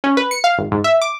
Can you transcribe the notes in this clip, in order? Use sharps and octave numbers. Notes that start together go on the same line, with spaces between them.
C#4
B4
C#7
F5
G#1
G#2
E5
D6